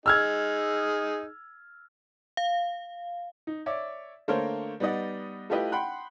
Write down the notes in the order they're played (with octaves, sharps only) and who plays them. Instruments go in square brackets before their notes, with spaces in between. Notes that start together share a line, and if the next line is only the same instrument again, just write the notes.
[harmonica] D#4 G#4 [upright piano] E6 F6 G#6
[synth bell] F5
[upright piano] D#4
C#5 D5 E5 D6
D3 A3 A#3 A#4 C5 C#5
G3 B3 D#4 D5 D#5 F#5
A3 E4 F4 G4 B4 D#5
F#5 G5 B5 C6 F#6